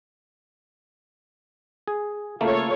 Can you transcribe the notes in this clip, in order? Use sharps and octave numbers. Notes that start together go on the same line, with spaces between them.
G#4
C#3 A3 A#3 F4 A4 C#5